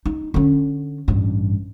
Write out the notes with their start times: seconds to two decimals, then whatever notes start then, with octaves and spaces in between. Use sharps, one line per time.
0.06 D#4
0.34 D3 C#4
1.08 A1 G2